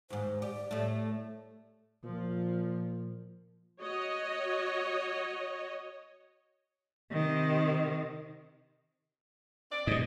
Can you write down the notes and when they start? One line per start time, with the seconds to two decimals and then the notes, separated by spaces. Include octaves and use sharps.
0.10 D#2 G#2 C5
0.42 G4 D5
0.71 A2 A3
2.04 A#2 F3
3.81 F#4 C#5 D#5
7.12 C3 D#3
9.72 C4 D5
9.87 G#2 B2 D#5